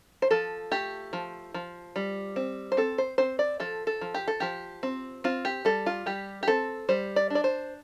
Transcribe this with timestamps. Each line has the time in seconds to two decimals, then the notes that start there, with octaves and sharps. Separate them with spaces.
0.22 C5
0.31 F3 A4
0.72 A3 G4
1.13 F3
1.54 F3
1.96 G3
2.36 C4
2.72 C5
2.77 C4 A4
2.98 C5
3.18 C4 C5
3.39 D5
3.60 F3 A4
3.87 A4
4.01 F3
4.14 G4
4.28 A4
4.40 F3 G4
4.83 C4
5.24 C4 F4
5.45 G4
5.65 G3 A4
5.86 F4
6.06 G3 G4
6.43 G4
6.48 C4 A4
6.89 G3 C5
7.16 D5
7.30 D4 D5
7.44 C5